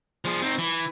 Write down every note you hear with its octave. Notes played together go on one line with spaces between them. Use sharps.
F3 G#4
C4 D#4
E3